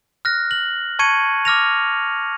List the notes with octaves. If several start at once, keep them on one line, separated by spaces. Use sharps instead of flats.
F6 F#6 A#6
F#7
A5 C#6 G#6 C#7 D#7
D6 F6 A#6 F7